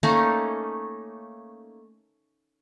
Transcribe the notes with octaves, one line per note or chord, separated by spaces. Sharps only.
A3 A#3 C#4 D#4